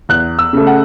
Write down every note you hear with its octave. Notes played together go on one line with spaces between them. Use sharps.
E2 F#6
E6
C#3 A3
F#5